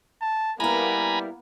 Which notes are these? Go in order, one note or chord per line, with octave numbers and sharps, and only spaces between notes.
A5
G3 A#3 B3 E4 A#4 G#5 A#5 B5